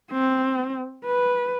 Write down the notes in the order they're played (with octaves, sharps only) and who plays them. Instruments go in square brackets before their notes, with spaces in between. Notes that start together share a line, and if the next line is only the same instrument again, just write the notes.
[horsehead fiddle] C4
B4